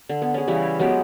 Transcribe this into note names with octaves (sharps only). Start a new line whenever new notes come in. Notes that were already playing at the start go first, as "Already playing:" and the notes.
D3
B3
C#4 G#4
C#3 E3 G3 E4
F#3 G#3 B3 G4